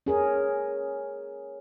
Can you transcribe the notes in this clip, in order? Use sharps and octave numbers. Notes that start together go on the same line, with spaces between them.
C#4 G#4 A#4